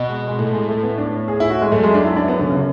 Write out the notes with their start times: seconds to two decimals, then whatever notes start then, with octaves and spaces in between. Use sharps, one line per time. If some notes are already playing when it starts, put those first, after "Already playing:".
Already playing: B2
0.09 G#3
0.28 G#3
0.39 A2 A3
0.53 G#3
0.68 A3
0.83 B3
0.98 D4
1.28 G#4
1.40 E4
1.50 F#4
1.62 G#3
1.72 F#2 A3
1.84 G#3
1.94 D4
2.05 E4
2.16 D4
2.28 B3
2.39 D3
2.50 C#3